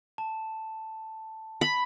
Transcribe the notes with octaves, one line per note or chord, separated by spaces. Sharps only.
A5
B5